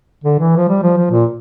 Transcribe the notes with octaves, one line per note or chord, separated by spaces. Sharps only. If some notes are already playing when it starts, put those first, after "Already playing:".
D3
E3
F3
G3
F3
F3
A#2